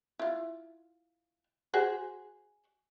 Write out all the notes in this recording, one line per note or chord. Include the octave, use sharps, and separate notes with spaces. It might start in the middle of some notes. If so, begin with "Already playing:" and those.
E4 F4
F#4 G#4 C5